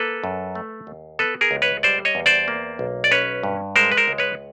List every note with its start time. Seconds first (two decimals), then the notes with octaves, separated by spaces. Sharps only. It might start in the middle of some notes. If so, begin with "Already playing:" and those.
Already playing: A#3 A4 B4
0.24 F#2
0.55 A3
0.87 D#2
1.19 B3 A4 B4
1.41 G#4 A#4
1.51 C#2
1.62 B4 C#5
1.83 G3 C5 D5
2.05 C#5 D#5
2.15 E2
2.26 C5 D5
2.48 A#3
2.79 B1
3.04 D5
3.11 C#4 B4 C#5
3.43 G2
3.76 G#3 A#4 C5
3.92 B4
3.97 A#4 C5
4.08 C#2
4.18 B4 C#5